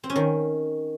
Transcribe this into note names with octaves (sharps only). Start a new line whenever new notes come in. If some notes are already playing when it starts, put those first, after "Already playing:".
C4
C#4
D#3